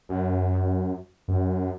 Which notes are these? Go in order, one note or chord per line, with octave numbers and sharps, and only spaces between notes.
F#2
F#2